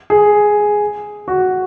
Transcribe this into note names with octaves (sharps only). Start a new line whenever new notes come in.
G#4
F#4